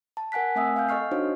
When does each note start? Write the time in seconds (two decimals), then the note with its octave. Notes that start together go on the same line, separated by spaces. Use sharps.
0.17 A5
0.32 A#4 F#5 G#5 F#6 B6
0.55 A3 C4 E5 G#5 D#6 E6
0.76 F5 G5 F6 G6
0.89 A4 D#5 C#6 F6 C7
1.11 D4 D#4 F#4 C5 C#5